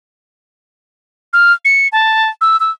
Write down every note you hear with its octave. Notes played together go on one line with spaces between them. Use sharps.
F6
C#7
A5
E6
E6